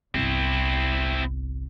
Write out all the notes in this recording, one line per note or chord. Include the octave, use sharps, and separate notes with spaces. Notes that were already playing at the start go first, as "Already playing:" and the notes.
G1 C2 C4 E4